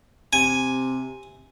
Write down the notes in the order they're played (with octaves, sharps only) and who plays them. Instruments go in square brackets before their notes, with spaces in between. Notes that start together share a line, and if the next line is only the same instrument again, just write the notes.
[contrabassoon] C3 [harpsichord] G#5